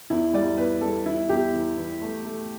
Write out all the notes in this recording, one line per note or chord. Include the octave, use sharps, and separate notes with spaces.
E2 E4
G3 D5
E2 B4
G3 A4
E3 E4
E2 G4
E3
E3
A3
A3